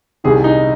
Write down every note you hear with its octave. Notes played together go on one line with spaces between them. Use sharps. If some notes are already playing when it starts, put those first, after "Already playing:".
C2 C3 D#3 G#4
D#4